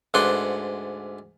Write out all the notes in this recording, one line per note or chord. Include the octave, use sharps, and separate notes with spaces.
D2 G#2 D4 B4 F#5 C6